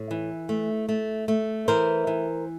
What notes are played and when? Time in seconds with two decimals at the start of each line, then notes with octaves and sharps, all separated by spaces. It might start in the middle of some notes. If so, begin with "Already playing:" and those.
Already playing: A2
0.11 E3
0.49 A3
0.89 A3
1.28 A3
1.68 E3 A#4 C5
2.07 E3